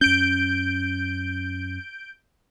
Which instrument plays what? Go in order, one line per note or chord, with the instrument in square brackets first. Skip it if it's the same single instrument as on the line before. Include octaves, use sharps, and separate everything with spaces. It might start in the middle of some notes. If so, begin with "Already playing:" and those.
[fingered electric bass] F#2 C#4 [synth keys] G6 D7